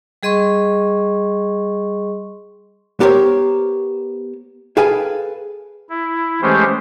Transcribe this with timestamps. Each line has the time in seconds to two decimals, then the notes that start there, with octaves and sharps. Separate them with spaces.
0.23 G3 G#4 D#5 C6 C#6
3.00 B3 G4 A#4 C5 C#5
4.77 G#4 A4 B4 F5 G5 G#5
5.90 E4
6.42 E3 G#3 A3 C#4 G4 C5